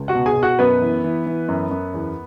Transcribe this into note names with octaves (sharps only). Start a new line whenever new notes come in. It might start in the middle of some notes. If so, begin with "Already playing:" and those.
Already playing: C#2
F#4 F#5
B2
G#4 G#5
B2
F#4 F#5
F#2 B3 B4
E3
E3
E3
F#2
F#2
E2